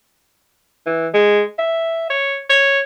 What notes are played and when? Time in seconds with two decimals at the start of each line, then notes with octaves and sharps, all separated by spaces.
0.86 E3
1.14 G#3
1.59 E5
2.10 C#5
2.50 C#5